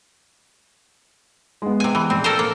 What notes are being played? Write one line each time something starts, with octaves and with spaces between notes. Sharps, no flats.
G#3 B3
C3 G#5
E3
A#1 C4
A4 A#4 C5
A#3